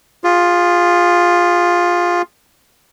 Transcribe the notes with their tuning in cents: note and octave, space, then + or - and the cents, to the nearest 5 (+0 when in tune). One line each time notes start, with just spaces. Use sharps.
F4 +10 G#4 -30